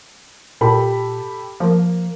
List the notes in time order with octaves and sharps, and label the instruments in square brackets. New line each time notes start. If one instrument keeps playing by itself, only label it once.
[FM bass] A#2 [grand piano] G4 A4 B5
[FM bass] F3 [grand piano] A#3